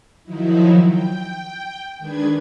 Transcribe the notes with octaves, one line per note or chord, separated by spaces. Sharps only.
D#3 F3 F#3 D#4 E4
G5
D#3 G#3 D4 B4 G#6